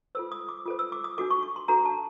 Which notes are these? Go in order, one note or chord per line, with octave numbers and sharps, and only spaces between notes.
F4 A4 C5 E6
D#6
D6
F4 A4 C5 D#6
E6
D6
D#6
D4 F#4 A4 D6
C#6
C#6
C6
D4 F#4 A4 A#5
A5